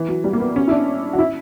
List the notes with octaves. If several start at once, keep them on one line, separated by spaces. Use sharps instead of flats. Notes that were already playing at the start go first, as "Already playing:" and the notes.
Already playing: E3
F#3
G3
A#3
B3
C#4
E4
D4
F#4
E4